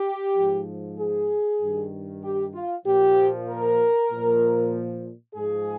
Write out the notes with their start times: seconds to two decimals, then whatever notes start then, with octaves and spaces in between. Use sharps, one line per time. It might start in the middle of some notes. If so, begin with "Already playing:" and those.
Already playing: G4
0.35 G#2 F3
0.98 G#4
1.60 G2 D#3
2.23 G4
2.54 F4
2.85 A#2 F3 G4
3.48 A#4
4.10 A#2 F3
5.34 G#2 F3 G#4